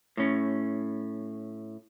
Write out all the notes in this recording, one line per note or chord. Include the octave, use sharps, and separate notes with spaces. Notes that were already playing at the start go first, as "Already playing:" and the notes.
A2 C#4